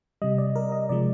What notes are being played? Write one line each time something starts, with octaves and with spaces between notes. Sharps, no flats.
C3 G3 D#5
D5
A#4
D#5
C3 F3 G#3 D5